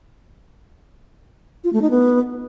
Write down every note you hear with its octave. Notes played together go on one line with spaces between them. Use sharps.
F4
A3
D#4
B3